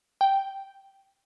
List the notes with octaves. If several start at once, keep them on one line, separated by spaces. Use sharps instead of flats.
G5